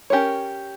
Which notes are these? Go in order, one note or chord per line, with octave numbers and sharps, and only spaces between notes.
C#4 G4 A#4 C#5